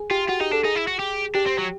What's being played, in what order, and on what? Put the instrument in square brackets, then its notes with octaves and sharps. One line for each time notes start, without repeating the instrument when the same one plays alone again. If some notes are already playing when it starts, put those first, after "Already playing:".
Already playing: [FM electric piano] G#4
[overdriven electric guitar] F4 [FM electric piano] G4
[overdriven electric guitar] F4 [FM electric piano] F#4
[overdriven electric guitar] D#4 [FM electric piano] G4
[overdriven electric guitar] D4 [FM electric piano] A4
[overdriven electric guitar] D#4 [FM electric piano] G#4
[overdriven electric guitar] E4
F#4
G4
[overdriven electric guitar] D4 [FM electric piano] G4
[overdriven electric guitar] C4
F#3